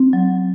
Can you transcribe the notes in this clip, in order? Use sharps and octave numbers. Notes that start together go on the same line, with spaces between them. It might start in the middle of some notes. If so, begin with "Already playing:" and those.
Already playing: C4
F#3